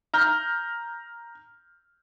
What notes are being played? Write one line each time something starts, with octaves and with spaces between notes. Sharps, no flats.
A#5 F6 G6